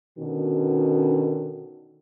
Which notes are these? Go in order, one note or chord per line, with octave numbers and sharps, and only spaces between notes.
B2 D3 D#3 C#4 F#4